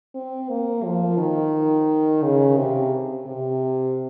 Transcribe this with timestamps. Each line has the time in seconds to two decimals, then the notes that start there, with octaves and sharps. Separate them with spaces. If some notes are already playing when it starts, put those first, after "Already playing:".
0.15 C4
0.50 A#3
0.84 F3
1.18 D#3
2.23 C#3
2.58 C3
3.26 C3